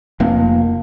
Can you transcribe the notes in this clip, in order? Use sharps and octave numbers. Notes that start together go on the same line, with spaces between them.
F1 A#3